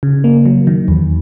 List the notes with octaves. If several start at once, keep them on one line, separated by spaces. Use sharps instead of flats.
C#3
A#3
F#3
D#3
E2